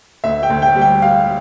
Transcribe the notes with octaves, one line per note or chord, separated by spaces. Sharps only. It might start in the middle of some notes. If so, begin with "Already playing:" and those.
D2 E5
G5
D2
G5
G3
G5
G3 F5